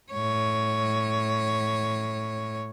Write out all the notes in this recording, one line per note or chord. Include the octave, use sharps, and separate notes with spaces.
A2 C#5